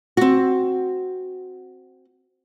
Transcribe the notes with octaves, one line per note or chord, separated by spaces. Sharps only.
C4 F#4